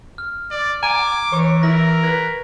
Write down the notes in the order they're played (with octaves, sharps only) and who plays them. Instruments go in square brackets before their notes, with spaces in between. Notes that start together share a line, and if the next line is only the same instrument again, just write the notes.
[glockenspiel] F6
[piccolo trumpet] D5
[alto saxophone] G#5 [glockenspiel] A#5 D7 [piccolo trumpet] D6
[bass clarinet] E3 [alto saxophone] C#5 [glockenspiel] C#6
[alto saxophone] E4 [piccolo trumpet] A#4 [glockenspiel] A#6
[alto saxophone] B4 [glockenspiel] G#6